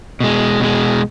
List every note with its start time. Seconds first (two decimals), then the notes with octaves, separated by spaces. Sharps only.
0.20 B2 G#3
0.60 B2 G#3